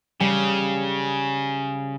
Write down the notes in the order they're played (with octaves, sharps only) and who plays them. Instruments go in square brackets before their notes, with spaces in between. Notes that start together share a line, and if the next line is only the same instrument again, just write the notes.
[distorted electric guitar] C#3 [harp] G3